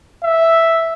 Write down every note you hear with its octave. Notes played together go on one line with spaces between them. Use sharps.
E5